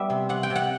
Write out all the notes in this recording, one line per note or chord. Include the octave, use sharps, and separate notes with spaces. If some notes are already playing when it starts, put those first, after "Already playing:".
Already playing: G3 B3 E5
C3
C3 F#5
G5
C3
F#5